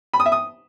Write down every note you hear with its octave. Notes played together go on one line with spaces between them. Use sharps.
B5
D#6
E5
D#6